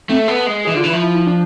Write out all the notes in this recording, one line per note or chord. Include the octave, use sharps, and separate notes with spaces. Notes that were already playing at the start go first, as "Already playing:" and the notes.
A3 C4
B3 A4
G#3
E3 G#4
D3 F4
E3
E4
F3
E4
E4
D4